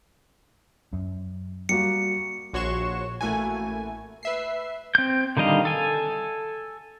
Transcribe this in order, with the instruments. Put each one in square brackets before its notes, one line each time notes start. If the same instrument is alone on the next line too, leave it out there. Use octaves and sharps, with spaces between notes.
[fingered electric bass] F#2
[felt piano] G3 A#3 F#4 [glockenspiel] C#7
[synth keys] A#1 F#4 C#5 C6 C#6 E7
A1 A3 A#3 E4 F#4 G#5
B4 E5 C7
[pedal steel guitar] C4 G6
D3 D#3 G3 D#5 F5
A4 G#5